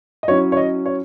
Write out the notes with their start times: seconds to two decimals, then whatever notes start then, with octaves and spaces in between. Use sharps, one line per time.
0.23 D#5
0.28 F#3 C#4 E4 C#5
0.52 C#5
0.57 D#5
0.86 C#5